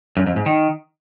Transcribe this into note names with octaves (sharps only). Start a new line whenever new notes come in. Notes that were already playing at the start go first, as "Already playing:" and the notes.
F#2
F2
G#2
D#3